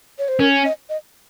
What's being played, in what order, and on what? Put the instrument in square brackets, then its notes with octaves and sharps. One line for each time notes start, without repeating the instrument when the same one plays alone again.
[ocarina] C#5
C5
[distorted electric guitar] C#4 [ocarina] A#4
[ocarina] D#5
D#5